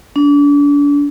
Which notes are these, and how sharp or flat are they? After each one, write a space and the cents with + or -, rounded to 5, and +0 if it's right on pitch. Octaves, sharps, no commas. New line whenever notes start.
D4 -35